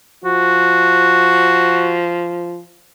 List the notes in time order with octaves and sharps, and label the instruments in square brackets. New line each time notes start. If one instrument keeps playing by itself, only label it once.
[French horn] F3 [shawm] F#4